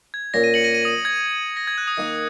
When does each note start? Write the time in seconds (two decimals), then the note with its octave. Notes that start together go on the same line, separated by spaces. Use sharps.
0.14 G#6
0.34 A#2 A#3 C#4 A#6
0.44 A#6 D#7
0.54 C#7 F#7
0.64 A#6 D#7
0.74 A#6 D#7
0.85 D#6
0.95 D#6
1.05 G#6
1.57 A#6
1.67 G#6
1.78 F#6
1.88 D#6
1.98 D#3 A#3 D#4